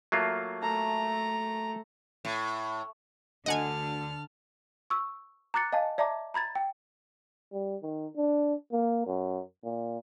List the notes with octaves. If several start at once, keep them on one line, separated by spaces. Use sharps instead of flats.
F#3 A3 A#3 F4
A3 A5 A#5
A2
D2 D3 D#5 F#5 G#5 A5 F6
C#6 E6
A#5 D6 F#6 A6 C#7
D#5 F5 G#5 A5
D5 E5 A5 A#5 D6
A#5 B5 G#6 A6
G5
G3
D#3
D4
A#3
F#2
A#2